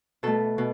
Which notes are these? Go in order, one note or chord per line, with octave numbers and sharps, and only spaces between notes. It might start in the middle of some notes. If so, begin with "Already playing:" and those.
B2 A3 A4
B2